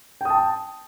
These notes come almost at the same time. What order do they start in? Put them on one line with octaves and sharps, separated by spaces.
G5 D#6 A5